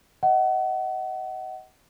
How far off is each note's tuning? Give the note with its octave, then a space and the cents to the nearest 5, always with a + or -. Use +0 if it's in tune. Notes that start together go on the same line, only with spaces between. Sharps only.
D#5 +25 F#5 +30